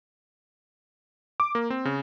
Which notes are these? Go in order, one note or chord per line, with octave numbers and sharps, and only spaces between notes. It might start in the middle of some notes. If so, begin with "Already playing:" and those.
D6
A#3
C4
C#3